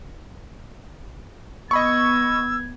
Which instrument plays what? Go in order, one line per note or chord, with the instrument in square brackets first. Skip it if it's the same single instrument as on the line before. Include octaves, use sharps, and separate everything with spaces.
[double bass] B3 [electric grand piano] D#5 B5 C#6 [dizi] E6 [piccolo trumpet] G#6